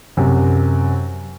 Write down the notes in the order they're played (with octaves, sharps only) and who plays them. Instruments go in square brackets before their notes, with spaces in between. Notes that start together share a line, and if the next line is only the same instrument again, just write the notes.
[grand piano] F#2 C3